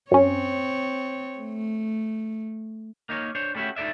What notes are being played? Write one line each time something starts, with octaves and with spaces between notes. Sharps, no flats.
F#2 C4 C#4 C#5
A3
A#3 D#4 A#4 C#5
D4 C5 C#5
G3 A3 C#4 E4 F#4 G4
D#4 E4 A4 D5 E5